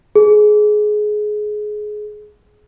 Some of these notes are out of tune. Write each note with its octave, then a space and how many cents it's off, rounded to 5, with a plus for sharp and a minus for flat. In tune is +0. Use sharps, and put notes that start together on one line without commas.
G#4 +20